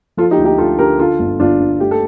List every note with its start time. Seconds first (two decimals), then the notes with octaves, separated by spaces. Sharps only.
0.17 F3 F4 A4
0.31 D#4 G4
0.38 D2
0.45 D#4 G4
0.58 D2 F4 A4
0.79 D3 G4 A#4
0.99 D3 F4 A4
1.19 G1
1.40 G1 D4 F4
1.60 G2
1.80 A3 G4
1.91 A4